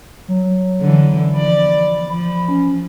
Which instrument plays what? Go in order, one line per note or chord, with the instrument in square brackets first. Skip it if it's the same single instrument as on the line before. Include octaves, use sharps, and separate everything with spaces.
[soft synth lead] F#3
[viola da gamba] D3 E3
[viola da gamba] F3 D5 [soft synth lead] B5
[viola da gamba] F3 [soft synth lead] B5
[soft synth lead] C#4